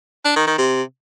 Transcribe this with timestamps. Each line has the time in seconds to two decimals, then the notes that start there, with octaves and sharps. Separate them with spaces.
0.25 D4
0.36 D#3
0.47 D#3
0.58 C3